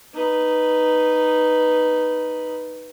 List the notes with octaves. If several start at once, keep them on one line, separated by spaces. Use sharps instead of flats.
D#4 B4